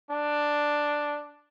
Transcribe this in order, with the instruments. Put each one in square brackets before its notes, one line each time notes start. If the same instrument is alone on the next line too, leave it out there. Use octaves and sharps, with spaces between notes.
[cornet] D4